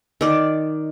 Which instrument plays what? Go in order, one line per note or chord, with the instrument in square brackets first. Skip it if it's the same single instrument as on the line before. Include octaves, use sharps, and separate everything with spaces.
[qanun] D#3 D5